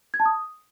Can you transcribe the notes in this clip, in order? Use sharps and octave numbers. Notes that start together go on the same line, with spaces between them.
G#6
A5
D#6